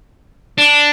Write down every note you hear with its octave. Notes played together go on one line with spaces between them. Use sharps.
D4